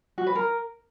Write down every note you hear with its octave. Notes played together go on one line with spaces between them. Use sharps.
F#4
B4
A#4